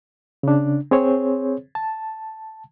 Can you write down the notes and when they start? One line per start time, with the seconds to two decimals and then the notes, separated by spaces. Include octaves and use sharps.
0.43 C#3 D4
0.91 C4 G#4 C5 C#5
1.75 A5